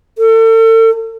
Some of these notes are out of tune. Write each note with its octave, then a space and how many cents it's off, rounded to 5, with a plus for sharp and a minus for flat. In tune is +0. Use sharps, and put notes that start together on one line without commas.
A4 +40